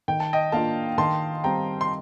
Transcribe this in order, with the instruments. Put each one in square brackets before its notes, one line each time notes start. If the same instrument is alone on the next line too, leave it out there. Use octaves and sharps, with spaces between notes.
[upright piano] D#3 [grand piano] G5
[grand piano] A5
D#5 G5
[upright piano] A#3 D4 F4 [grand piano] F5 A5
[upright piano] D#3 [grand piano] A5 C6
[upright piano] G3 C4 [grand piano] G5 A#5
[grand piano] C6